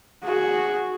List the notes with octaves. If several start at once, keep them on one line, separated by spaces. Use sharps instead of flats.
F#4 G#4